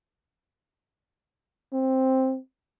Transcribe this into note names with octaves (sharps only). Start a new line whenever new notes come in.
C4